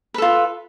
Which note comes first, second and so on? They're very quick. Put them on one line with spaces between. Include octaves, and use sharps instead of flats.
B4 A4 F4